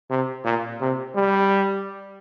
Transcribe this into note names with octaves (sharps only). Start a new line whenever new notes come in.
C3
A#2
C3
G3